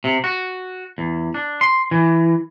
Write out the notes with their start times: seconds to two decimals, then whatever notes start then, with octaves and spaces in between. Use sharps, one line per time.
0.04 C3
0.24 F#4
0.98 E2
1.34 D4
1.61 C6
1.91 E3